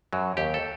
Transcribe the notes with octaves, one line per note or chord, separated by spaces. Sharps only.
F#2 F#3
D#2 G4
A4